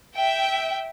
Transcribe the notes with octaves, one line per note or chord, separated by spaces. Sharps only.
E5 G5